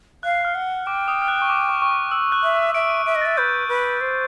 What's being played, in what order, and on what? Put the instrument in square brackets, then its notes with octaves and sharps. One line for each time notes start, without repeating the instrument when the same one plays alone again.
[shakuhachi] F5 [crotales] F#6
[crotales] F6
[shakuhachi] F#5
[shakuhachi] G5 [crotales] D6
[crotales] D#6
F6
F#6
C#6
D6
C#6
C#6
D6
E6
F#6
[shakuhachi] E5
[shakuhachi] E5 [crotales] D7
[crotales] D#7
[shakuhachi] E5 [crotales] D7
[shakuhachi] D#5
[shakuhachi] E5 [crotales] A6
[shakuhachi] B4 [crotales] G6
[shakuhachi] B4
C5